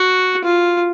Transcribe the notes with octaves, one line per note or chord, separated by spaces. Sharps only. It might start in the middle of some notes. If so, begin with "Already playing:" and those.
Already playing: F#4
F4